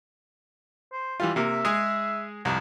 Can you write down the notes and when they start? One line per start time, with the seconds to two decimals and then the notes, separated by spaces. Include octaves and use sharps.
0.93 C5
1.20 E3 G3 F4
1.36 C3 A#3 E5
1.65 G#3 G#4
2.45 C2 F2 G4